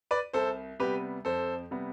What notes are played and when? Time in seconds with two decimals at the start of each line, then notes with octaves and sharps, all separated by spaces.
0.11 B4 D5
0.33 C2 A4 C5
0.80 C3 G3 B3 G4 B4
1.25 F2 A4 C5
1.71 C3 G3 B3